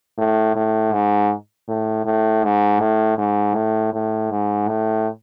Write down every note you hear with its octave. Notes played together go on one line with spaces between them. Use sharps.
A2
A2
G#2
A2
A2
G#2
A2
G#2
A2
A2
G#2
A2